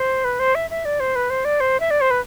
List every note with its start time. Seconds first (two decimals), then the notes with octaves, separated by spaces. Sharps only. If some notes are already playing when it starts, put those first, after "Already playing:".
Already playing: C5
0.24 B4
0.39 C5
0.55 E5
0.70 E5
0.85 D5
1.00 C5
1.15 B4
1.30 C5
1.45 D5
1.60 C5
1.80 E5
1.91 D5
2.01 C5
2.11 B4